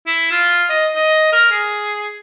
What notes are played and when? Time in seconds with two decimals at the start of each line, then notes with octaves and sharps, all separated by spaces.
0.07 E4
0.32 F4
0.70 D#5
0.95 D#5
1.33 A#4
1.51 G#4